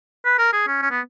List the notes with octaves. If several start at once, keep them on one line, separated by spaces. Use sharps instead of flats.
B4
A#4
G#4
C#4
C#4
B3